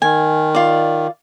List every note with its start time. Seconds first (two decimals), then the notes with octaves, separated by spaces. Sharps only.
0.02 D#3 G#5
0.55 F4 D5